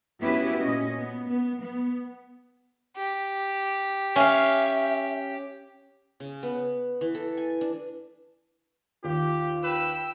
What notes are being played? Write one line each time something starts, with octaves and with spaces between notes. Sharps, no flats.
B3 C#4 E4 F#4 G4 B4
A#2 C#4 D#5
B3
B3
B3
G4
C#4 E5 F5
C#3
B3
E3
A4
G#5
D4
D#2 F4 G4
B4 G5 E6